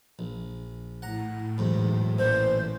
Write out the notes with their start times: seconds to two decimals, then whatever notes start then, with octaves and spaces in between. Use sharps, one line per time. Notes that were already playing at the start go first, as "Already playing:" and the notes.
0.19 A#1
1.02 A2 F#5 A#5
1.58 B1 E2 G#2
2.19 A1 A#2 E3 C5